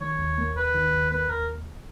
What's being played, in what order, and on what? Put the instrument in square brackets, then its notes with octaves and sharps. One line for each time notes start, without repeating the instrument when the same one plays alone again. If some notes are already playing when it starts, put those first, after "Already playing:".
[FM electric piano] D#3 [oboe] C#5
[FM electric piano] D#2
A#3
[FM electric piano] D#2 [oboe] B4
[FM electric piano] D#3
D#2
[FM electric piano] A#3 [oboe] B4
[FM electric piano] D#2 [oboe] A#4